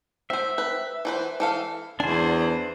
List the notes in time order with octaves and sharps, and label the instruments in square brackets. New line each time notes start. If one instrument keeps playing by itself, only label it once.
[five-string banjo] C4 C5 [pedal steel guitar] E5
[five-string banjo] B4
E3 B4 C5
E3 A4 F5
[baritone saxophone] E2 [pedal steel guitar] D4 C5 [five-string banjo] G#5